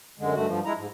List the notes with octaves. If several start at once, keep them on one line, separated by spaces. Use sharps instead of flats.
F#2 D3 G#3
G2 A3 F#4
G2 F3
G#3 E4 A#5
G#2